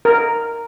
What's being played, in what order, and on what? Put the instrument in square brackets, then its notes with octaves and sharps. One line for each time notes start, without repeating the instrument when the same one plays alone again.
[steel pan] A#4